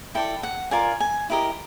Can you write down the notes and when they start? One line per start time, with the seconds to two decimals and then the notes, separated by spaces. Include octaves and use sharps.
0.15 E4 A4 D5 G5
0.43 F#5
0.71 F4 A#4 D5 G#5
1.00 G#5
1.30 E4 G4 A#4 D#5